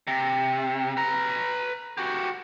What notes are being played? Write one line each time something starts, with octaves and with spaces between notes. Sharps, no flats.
C3
B4 A#5
F#4 G4